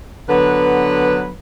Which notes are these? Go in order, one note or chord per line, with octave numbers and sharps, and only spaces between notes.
D3 F#3 B3 B4